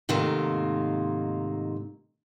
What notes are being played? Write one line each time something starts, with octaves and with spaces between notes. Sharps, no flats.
G#2 C3 D#3 A3 A#3 F4